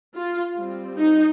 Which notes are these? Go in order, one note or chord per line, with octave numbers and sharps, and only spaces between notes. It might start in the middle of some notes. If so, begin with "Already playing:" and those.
F4
G3 C4
D#4